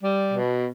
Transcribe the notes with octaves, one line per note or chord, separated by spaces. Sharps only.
G3
B2